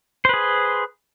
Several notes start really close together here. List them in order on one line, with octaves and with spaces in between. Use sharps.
C5 B4 G#4